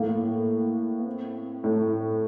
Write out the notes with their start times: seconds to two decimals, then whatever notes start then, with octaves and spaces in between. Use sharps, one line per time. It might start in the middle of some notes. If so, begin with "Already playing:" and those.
Already playing: A2 A#3
0.99 B3
1.07 C4
1.64 A2